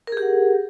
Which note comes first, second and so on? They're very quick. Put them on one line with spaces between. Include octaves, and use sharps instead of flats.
A#4 G#4 G4 F#5